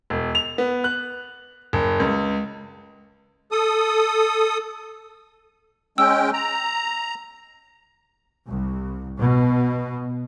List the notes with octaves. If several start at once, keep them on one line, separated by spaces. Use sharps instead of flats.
E1
F7
B3
F#6
F#1
C#2
A4 D#6
G#3 C#4 G5 E6
A#5
C2
B2